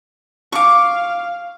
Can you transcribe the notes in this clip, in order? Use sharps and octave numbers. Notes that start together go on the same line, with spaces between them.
F5 C#6 D6